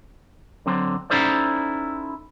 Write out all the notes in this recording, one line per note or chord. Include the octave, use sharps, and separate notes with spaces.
D3 F#3 C4
C#4 D#4 E4 A4 C5 D5